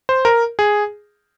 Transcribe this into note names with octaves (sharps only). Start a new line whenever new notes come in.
C5
A#4
G#4